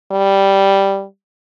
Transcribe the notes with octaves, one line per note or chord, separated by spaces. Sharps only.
G3